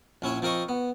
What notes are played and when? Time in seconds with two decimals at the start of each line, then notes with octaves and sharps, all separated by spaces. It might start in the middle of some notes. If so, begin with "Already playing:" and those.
0.22 A#1 C#4 E4 C#5
0.42 F3 C4 A#4 D#5 C#6
0.69 B3